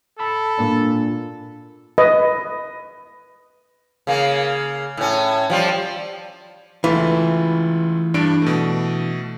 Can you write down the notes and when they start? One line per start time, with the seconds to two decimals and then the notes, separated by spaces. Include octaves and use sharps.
0.19 A4 A5 B5 E6
0.58 A#2 A#3 D4
1.98 B4 D#5
4.07 C#3 A#3
4.97 A2 C#4
5.50 F3 G3
6.84 C#2 E3 A3 F4
8.14 G2 D4 D7
8.42 B2 A3